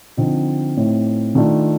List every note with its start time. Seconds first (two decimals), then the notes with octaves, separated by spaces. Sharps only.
0.17 D3 F3 C4 D#4
0.77 A2 A3 C4 D#4
1.35 D#3 A3 D4 F4